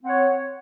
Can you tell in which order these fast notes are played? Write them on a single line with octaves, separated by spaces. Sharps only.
C4 F#5 C#5